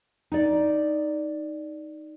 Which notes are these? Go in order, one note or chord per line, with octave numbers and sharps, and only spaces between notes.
D#4 D5